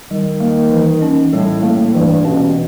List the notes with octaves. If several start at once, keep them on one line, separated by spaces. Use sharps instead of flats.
D#3 G3
A#3
E3
C#4
A2 G3
A2 A#3
G2 E3
B2 C#4